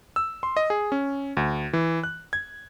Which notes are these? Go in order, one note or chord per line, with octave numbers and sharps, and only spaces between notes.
E6
C6
D#5
G#4
C#4
D2
E3
F#6
G#6